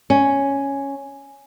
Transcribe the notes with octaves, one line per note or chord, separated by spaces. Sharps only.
C#4